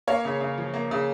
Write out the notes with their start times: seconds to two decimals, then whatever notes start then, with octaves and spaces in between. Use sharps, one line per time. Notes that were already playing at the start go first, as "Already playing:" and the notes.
0.07 A#3 C#5 F5
0.25 C#3
0.41 C#3
0.58 F3
0.74 A#3
0.91 C#3